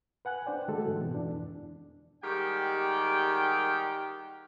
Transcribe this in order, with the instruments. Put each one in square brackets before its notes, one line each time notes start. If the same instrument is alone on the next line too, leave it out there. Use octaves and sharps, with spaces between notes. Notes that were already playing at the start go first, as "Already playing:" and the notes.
[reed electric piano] B4 F#5 G#5 F#6
D4 C5 D5 G5
D3 G#3 A3 F#4 A4
G#2 E3
B2
F2 E3 D4
[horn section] D#3 G3 G#3 G4 F#5 G5